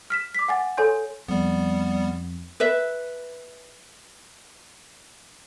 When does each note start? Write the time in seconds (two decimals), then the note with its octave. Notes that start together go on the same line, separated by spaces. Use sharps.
0.10 F6 B6 E7
0.35 D6 B6
0.48 F#5 G#5 A6
0.77 A4 C#5 G#5 C6 G6
1.28 F2 G3 B3
2.60 B4 E5